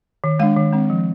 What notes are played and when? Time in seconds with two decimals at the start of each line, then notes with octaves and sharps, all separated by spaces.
0.24 D#3
0.39 G#3 D4 F5
0.57 D#3
0.73 G#3 C4
0.90 F3